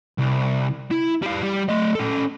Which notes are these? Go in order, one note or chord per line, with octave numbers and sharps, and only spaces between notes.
C2
E4
G3 F5
G3
A3 D#5
C#4 A4